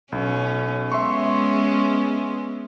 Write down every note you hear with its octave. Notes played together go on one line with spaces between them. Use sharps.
B1 C#4
G#3 B3 C#4 E5 C6 C#6